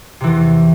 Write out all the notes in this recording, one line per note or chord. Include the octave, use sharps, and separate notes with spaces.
E2 C3 E3